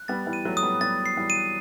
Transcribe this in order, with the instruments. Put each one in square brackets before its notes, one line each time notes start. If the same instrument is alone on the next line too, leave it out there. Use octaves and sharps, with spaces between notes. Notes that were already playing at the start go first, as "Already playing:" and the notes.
Already playing: [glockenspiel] F#6
[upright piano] G3 B3 [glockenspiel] A6
[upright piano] E3 G3
[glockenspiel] D#7
[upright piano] F#3 A3
[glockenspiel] D#6
[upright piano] G3 B3
[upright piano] G3 B3 [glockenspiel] A6
[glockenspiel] C7
[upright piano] E3 G3
[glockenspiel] D#7